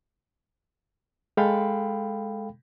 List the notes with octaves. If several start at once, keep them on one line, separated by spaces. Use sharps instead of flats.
G#3 A4 F5 G5 B5